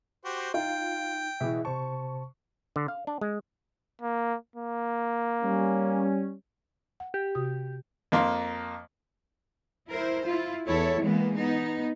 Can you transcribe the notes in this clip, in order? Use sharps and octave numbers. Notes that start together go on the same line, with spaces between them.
F#4 G4 C5
D#4 F4 G5
B2 E3 E4 G#4 E5
C3 C5 A5 C#6
D3
F5
D4
G#3
A#3
A#3
G3 C#4
F#5
G4
C3 F#4 D#6
F2 A#3 C6
E4 A#4 C5
E4 F4
E2 E4 A4 C#5
E3 G#3 A#3 B3
B3 D#4